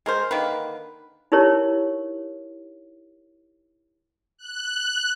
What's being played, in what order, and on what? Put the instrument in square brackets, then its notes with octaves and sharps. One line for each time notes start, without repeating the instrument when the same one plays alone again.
[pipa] G#3 A#4 C5
D3 D#3 A#3 B4
[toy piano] D#4 E4 G4 A#4 C#5
[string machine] F#6